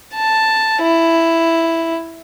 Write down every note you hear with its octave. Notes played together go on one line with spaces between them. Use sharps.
A5
E4